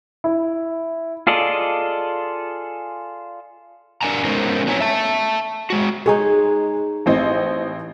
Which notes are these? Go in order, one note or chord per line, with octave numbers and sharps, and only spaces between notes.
E4
F4 G#4 A4 D5 D#5
D4 A#4 D5 G#5 A#5
G#3 B3 C#4 D#4 A#4 C5
F#3 C4 B4 C#5 G#5 A#5
E5 A5
G#3 F#4
G#3 D#4 G#4 C#5
A1 C4 D#5